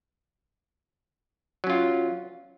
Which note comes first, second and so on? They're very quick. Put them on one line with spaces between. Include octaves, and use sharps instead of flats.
F#3 C#4 F4